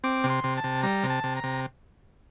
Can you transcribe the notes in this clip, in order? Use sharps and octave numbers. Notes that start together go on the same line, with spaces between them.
C4 D6
C3
C6
C3
A5
C3
G3 A#5
C3
A5
C3
A#5
C3